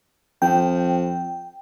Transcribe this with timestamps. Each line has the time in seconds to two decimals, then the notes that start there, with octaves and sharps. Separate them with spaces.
0.42 F2 G5